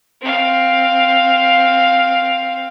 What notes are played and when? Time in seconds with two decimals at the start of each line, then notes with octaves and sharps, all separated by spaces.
0.21 C4 F5